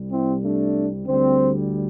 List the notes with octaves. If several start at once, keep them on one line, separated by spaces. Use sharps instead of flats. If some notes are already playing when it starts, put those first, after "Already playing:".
Already playing: C2 C3 G3
C4 E4
A3 D4
D2 D3 G3 C4